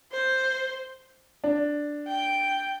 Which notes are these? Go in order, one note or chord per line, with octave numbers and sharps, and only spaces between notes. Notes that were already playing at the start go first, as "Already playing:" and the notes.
C5
D4
G5